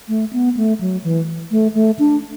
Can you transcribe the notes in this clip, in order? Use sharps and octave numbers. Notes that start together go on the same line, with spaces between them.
A3
B3
A3
F#3
E3
A3
A3
D4